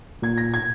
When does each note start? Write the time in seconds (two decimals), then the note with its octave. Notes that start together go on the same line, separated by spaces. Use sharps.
0.22 A#2 G#6
0.38 A#6
0.54 G#6